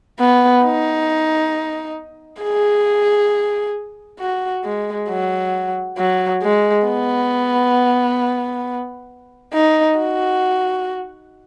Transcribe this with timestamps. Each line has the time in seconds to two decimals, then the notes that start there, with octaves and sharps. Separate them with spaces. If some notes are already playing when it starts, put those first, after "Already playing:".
0.20 B3
0.64 D#4
2.42 G#4
4.20 F#4
4.64 G#3
5.09 F#3
5.98 F#3
6.43 G#3
6.87 B3
9.54 D#4
9.98 F#4